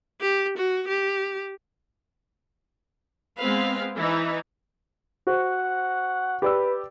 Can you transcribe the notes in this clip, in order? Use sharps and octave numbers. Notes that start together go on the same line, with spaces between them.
G4
F#4
G4
G#3 B3 C4 B4 F5
E3 D#4
F#4 C5 F#5
G4 B4 D5 E6